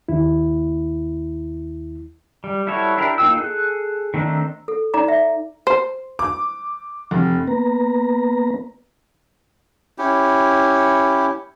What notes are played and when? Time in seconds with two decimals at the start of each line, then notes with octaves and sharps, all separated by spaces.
0.08 D#2 E4
2.44 G3
2.67 G3 E4 F#4 A4 C#5
2.97 D4 E4 G4 A#4
3.18 A#3 D#4 F4 G5 E6
3.37 G#4 A4 F#6
4.14 D#3 A3 C4 D4 D#4
4.68 A4
4.94 D#4 D5 A#5 D6
5.08 E5
5.67 C5
6.19 D6
7.11 F1
7.48 A#3 B3 B4 A#5
9.98 C#4 E4 G4